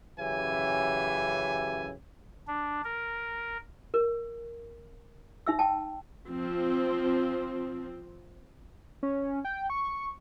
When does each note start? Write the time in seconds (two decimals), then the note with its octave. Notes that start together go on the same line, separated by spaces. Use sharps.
0.19 F#2 C#3 E3 G4 E5 G#5
2.47 D4
2.84 A#4
3.94 A#4
5.47 D#4 E5 E6
5.59 G5 A5
6.28 F3 C4
9.03 C#4
9.45 G5
9.70 C#6